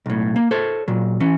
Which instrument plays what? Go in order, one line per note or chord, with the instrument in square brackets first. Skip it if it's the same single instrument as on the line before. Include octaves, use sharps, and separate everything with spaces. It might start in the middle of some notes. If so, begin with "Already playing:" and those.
[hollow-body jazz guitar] B1 A2
A#3
A4 C5 C#5
A#2 F#3
E3 C#4